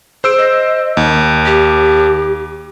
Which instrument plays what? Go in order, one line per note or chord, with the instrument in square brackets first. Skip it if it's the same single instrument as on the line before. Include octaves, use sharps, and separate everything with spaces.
[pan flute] G#4 [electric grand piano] C5 E6 D7
[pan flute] D#5
[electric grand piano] D#2
[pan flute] G4